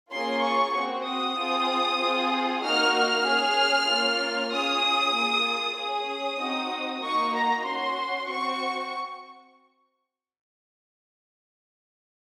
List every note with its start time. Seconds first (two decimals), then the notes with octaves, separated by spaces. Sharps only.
0.11 A#3 C#4 F4 G#4 C6
0.43 C#6
0.75 C4 F#4
1.06 D#6
1.37 C4 F4 G#4
2.00 C4 F4 G#4
2.63 A#3 D#4 F#4 F6
2.95 F6
3.25 C#4 G#4
3.89 A#3 C#4 F4
4.51 C#4 F4 G#4 D#6
5.14 A#3 F4 G#4
5.77 C#4 G#4 D#6
6.40 C4 D#4 F#4
7.03 A#3 D#4 F#4 C#6
7.34 A#5
7.66 C#4 F#4 C6
8.29 C4 F#4 C#6